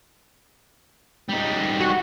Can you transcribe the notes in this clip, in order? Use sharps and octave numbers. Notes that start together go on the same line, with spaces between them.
G3 D#4
F#4